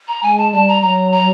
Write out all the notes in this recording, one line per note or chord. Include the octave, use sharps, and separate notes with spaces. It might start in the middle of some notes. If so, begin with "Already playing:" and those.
A#5
G#3 G#5
A5
G3 A5
A#5
F#3 A#5
A#5